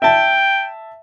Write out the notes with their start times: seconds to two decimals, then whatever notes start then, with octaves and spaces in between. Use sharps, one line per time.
0.02 E5 G5 A5